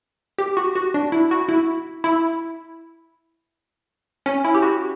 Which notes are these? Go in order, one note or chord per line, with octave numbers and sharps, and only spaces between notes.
G4
F#4
F#4
D4
E4
F#4
E4
E4
C#4
E4
G4
F#4